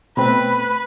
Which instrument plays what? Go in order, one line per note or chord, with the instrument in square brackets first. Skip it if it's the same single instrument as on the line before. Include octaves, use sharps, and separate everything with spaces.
[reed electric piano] B2 A3 C4 [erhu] B4 [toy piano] B5